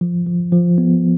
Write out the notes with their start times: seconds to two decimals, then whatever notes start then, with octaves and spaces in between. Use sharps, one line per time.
0.01 F3
0.27 F3
0.53 F3
0.78 B3